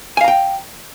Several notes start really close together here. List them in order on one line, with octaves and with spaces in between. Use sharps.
G#5 F5 A#5 G5